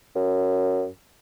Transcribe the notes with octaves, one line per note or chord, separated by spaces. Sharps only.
F#2